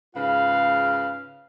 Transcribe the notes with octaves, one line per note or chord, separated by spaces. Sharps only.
G#2 C#3 F4 B4 F5